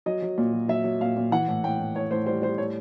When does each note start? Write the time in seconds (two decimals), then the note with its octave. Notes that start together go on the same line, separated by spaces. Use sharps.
0.06 F#3 D#5
0.22 F#3
0.38 A#2
0.53 F#3
0.68 F#3 E5
0.84 F#3
1.01 A#2 F5
1.16 A#2
1.31 E3 F#5
1.48 A2
1.64 A2 G5
1.79 A2
1.95 A2 C#5
2.11 A2 C5
2.26 G3 C5
2.42 G3 C5
2.58 A2 C#5